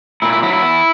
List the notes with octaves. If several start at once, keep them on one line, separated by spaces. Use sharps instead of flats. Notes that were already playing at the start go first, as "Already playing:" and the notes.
A#2 E4
E4
F#3 E4
E4
B3